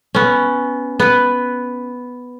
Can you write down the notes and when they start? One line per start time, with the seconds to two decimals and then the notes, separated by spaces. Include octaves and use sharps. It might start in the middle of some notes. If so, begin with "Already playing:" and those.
0.15 B3 C#4
1.00 B3 B4